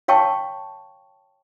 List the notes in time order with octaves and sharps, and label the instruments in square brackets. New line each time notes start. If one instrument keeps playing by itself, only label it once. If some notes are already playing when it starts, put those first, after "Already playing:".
[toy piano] C#5 F5 G5 A5 C#6